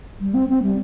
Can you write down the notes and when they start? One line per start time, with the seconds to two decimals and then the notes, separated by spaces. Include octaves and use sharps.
0.20 G3
0.34 C4
0.49 C4
0.62 G3